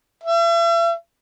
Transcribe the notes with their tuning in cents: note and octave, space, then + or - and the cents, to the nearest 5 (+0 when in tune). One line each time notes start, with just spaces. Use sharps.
E5 +40